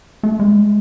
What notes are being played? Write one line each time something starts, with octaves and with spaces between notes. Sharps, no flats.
A3
G#3